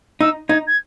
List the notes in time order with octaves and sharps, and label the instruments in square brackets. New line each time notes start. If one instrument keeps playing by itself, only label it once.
[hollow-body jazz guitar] D#4 [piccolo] E6
[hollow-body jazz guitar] D#4 [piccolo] G#6
[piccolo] G#6